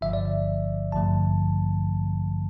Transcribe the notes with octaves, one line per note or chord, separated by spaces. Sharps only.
G1 G2 D3 F3 E5
D5
E5
A1 G2 D3 F3 A3 A5